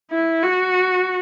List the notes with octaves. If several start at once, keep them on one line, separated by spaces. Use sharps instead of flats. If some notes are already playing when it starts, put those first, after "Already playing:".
E4
F#4